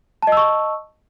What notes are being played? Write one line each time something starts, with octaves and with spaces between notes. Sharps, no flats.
D#5 A5 C#6 E6